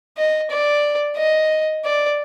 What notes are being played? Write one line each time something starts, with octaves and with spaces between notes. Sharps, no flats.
D#5
D5
D#5
D5